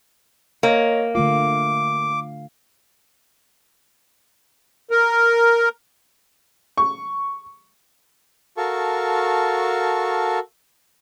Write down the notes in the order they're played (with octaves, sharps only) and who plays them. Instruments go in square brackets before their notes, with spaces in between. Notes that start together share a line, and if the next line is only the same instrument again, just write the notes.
[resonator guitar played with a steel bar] A#3 [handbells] C#5 D#5 A#5
[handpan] D3 A3 F4 [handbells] F5 [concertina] D6
[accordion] A#4
[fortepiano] C#6
[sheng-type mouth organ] F#4 A4 A#4 F5 A5 C#6